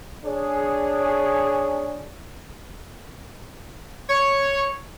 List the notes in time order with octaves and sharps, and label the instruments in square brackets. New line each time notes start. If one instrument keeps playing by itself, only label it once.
[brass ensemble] D4 G#4 C#5
[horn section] C#5